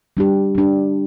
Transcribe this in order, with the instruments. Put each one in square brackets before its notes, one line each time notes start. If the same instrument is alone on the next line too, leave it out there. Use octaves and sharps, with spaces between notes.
[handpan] G3 D4 G4
G3 D4 G4